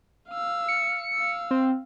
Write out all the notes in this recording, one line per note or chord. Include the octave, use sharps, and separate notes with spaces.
F5 E6
C#7
F5 E6
C4